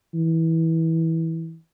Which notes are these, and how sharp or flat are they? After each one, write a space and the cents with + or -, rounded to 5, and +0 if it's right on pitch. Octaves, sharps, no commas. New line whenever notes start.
E3 -20